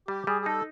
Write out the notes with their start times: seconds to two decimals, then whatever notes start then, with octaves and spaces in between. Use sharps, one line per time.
0.08 G3 G4
0.27 G3 G#4
0.41 G#4
0.46 D#4 A4